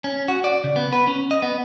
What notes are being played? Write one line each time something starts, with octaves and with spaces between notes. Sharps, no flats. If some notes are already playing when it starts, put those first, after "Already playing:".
C#4
F#4
D5
C#3
B3
B4
C#4
D#5
B3